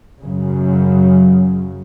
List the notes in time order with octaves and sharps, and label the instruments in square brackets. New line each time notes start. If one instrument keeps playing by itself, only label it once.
[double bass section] F#2 C#3